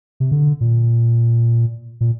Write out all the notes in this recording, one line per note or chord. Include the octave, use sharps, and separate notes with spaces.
C3
D3
A#2
A#2